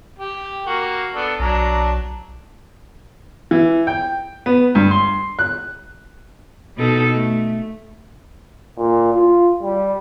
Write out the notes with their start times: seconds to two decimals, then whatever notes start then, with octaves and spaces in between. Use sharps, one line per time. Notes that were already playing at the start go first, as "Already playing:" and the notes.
0.19 G4
0.66 A#3 F#4
1.14 B3 D4 A4
1.39 B1 F#3 D4 A#5
3.51 E3
3.87 G5
4.46 B3
4.75 G2
4.91 C6
5.39 F#6
6.77 B2 D#4 A4
7.13 A3
8.77 A#2
9.14 F4
9.63 G3